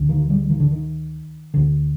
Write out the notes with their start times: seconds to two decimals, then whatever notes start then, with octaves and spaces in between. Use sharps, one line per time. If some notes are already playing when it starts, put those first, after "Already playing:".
Already playing: D2 D3
0.09 D#3
0.30 G3
0.50 D#3
0.60 D3
0.71 D#3
1.54 D2 D3